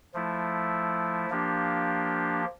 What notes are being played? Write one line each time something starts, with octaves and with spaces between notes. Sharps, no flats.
F3 A3 E4
F3 A#3 D4 G4